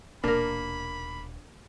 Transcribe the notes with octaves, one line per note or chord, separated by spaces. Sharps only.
D#1 B2 A#3 D4 A#4 B5